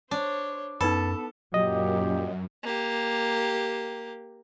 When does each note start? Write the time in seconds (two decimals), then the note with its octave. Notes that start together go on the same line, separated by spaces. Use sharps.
0.11 D4 C5 C#5
0.81 F#2 B3 D#4 A4 B4 B5
1.54 F#2 A#2 F#3 G4 D#5
2.63 A#3 G4